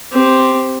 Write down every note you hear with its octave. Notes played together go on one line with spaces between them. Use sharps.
C4 G4